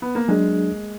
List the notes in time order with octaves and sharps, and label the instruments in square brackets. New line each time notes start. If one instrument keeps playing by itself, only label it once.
[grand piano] B3
A#3
[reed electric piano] F#3 D4 G#4 [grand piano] G#3